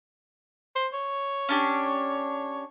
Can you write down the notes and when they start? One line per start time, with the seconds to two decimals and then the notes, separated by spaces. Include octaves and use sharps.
0.76 C5
0.94 C#5
1.49 C#4 D4 G4